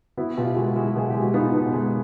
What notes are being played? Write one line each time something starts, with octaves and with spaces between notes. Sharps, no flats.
B3 E4 F#4
B2 F4 G4
G#3 F#4 G#4
G#3 E4 F#4
B2 G#4
G#3 G4
F#4
B3 D#4 F4
B2
G#3